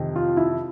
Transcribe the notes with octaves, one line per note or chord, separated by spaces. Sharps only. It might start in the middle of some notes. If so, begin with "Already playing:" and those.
Already playing: F2 C3 D#3
F4
E4